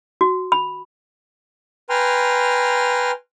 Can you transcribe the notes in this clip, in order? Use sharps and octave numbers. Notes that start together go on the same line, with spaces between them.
F#4
B5
B4 G5 G#5 A#5 C6 F6